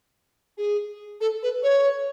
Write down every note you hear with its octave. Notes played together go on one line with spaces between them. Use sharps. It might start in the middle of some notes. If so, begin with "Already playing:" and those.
G#4
A4
B4
C#5